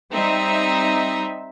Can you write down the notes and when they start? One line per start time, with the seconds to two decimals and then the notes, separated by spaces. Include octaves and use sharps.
0.12 G3 C4 D#4 E5